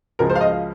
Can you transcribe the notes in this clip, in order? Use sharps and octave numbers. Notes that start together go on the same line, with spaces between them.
C#2 C#3 F3 A#4
C5
F5
D#5